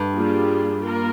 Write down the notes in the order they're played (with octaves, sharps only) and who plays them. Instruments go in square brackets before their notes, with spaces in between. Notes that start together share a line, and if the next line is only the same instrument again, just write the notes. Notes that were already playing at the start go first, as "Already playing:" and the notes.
Already playing: [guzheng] G2
[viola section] G3 A#3 F4 G#4
A#3 F4 A#4